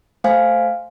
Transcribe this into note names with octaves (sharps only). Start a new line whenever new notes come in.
A3 C5 F5 G#5